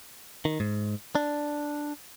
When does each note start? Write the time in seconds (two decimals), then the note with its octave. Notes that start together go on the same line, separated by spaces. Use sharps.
0.45 D#3
0.60 G#2
1.15 D4